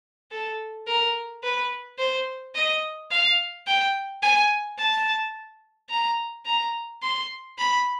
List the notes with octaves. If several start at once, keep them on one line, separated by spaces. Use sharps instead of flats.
A4
A#4
B4
C5
D#5
F5
G5
G#5
A5
A#5
A#5
C6
B5